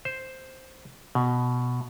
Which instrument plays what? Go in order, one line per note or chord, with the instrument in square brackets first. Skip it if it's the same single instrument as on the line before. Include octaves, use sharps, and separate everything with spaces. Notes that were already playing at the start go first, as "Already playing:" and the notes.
[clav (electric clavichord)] C5
B2